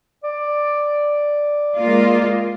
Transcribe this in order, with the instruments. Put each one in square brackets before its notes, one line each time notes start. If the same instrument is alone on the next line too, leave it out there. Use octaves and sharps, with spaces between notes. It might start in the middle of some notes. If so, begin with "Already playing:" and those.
[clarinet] D5
[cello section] G#3 A#3 F4